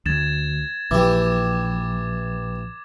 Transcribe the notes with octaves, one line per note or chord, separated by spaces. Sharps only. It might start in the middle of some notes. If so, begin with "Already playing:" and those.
D2 G#6 A6 E7
A#1 E3 G4 D6